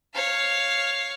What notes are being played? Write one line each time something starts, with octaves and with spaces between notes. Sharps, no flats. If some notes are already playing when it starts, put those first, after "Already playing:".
C#5 F5